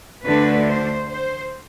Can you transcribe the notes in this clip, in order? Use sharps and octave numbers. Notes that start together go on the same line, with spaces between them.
D2 D3 A3 D4 B4
C5
C5